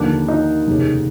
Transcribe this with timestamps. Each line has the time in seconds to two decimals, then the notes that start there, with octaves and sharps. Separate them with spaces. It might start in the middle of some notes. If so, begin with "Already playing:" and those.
Already playing: D#2 D3 F3 A#3 D4
0.28 D#4
0.67 F1 D#2 C#3